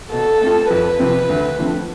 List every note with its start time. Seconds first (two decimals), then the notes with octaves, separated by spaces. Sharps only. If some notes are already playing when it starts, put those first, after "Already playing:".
0.12 B2 A4
0.41 A3 C4 F4
0.70 F2 B4
0.99 C3 F3 C4
1.29 D2
1.59 D3 F3 A3 C4